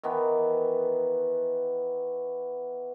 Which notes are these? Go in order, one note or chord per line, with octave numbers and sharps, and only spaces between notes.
D#3 E3 B3